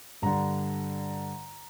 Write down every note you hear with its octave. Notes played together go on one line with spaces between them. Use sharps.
G2 D3 A#5